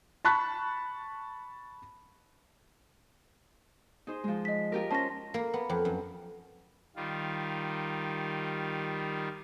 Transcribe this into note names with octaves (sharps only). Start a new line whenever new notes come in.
A5 B5 C#6 F#6 B6
D#4 G#4 C5
F3 G#3
D#5 B6
F4 G4 A#4
C#4 C5 A5 A#6
A#3
B3
F2
F#2
D#3 G3 F4